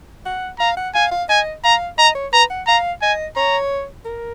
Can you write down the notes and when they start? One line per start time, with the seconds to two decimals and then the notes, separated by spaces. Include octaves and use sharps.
0.26 F#5
0.60 F5 A#5
0.77 F#5
0.95 F5 G#5
1.11 F5
1.29 D#5 G#5
1.64 F5 A#5
1.98 D#5 A#5
2.15 C#5
2.33 B4 A#5
2.50 F#5
2.67 F5 A#5
3.02 D#5 G#5
3.36 C#5 A#5
4.05 A#4